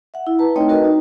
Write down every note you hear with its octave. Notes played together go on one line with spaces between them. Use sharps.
E5 F#5
E4
B4 A5 A#5
A3 C4 D#4 C#5 D#5 G5
F#4 A#4 B4 D#5
D#4